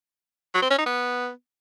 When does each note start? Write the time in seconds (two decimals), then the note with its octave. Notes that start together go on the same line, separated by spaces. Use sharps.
0.54 F#3
0.62 C4
0.70 C#4
0.78 D#4
0.86 B3